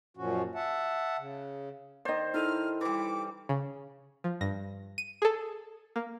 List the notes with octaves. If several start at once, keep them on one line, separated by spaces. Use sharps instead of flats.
F#2 A#2 F3 C#4 F#4
E5 F#5 A5
C#3
D#3 C5 D5 D#5
D#4 E4 A4 F6
E3 G3 D6
C#3
F3
G2 A#6
D#7
G#4 A4
A#3